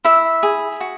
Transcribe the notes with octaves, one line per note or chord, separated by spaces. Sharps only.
E4 E5
G#4
F#4